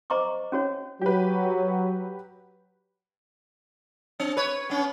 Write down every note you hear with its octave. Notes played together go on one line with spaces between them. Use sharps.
C5 D#5 A#5 C#6 D6
C#4 F#4 C#5
F#3 G4 B4
C4
B4 C#5
B3 C#4